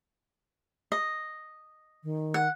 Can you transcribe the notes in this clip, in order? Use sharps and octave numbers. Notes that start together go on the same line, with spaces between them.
D#5
D#3
F#5